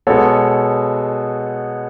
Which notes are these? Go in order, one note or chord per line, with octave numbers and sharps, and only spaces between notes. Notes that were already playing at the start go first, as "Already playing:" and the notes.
B2 G#3 B3 A4 C#5